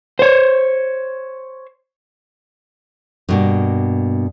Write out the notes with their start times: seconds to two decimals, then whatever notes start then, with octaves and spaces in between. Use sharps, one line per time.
0.19 C5 C#5
3.29 G2 B2 A#3